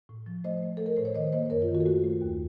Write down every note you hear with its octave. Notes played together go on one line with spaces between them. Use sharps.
A2
F3
A3 C5 D#5
A3
A3 A4
A#4
A2 C5
C#5
D#3 C5 D#5
A#3 C5 D#5
F#2 A#4 C#5
F4
D#3
F#4
A4
A3 F#4
A3
D#2